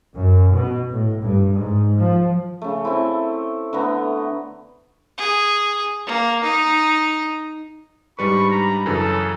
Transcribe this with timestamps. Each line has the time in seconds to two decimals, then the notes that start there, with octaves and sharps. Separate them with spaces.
0.14 F#2
0.52 B2
0.90 A2
1.22 G2
1.54 G#2
1.99 F3
2.62 C#3 A3
2.85 A3 C4 E4
3.73 D3 A3 B3 A#5
5.18 G#4
6.06 A#3
6.44 D#4
8.19 G#2 G3 D4 B4 B5 C#6
8.51 A#5
8.86 F#2 C#3 E3 A4